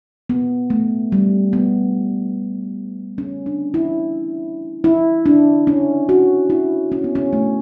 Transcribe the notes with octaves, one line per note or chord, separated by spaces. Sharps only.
B3
A3
G3
B3
C#4
D4
E4
E4
D4
C#4
F#4
E4
C#4
B3
C#4
A3